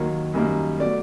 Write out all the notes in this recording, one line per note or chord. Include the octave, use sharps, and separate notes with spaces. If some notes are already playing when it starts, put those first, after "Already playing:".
Already playing: D#2 D#3 F#3 A#3
F#2 D#3 G3 A#3
B2 F#3 A3 D5